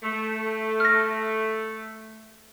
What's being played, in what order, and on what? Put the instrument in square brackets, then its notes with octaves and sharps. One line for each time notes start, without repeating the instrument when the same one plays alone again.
[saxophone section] A3
[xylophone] F6 A#6